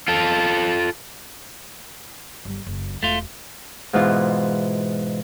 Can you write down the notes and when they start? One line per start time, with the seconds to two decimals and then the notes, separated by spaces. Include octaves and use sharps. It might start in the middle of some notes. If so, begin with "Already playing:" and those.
0.08 F4 A4
2.45 G1 G3
2.66 F#1
3.03 E1 A3 F4
3.93 G#2 B2 E3 F4